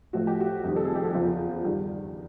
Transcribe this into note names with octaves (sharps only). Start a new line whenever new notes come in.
A2 F3 A3 F#4
G4
F#4
F2 C3 D#3 G3
A4
G#4
G4
F#4
E2 C#3 F3 F4
G2 D#3 G3